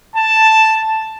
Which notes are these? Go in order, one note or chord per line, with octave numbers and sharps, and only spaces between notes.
A5